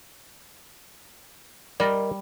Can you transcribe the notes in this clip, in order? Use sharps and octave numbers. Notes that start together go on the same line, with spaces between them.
G3 A#4 D5 D#5